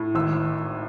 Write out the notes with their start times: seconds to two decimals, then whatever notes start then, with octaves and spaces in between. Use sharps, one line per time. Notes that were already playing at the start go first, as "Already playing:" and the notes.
Already playing: A2
0.15 G#1 E6